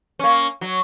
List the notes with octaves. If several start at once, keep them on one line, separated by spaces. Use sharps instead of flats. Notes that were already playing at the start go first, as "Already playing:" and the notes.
A#3 C#4
F#3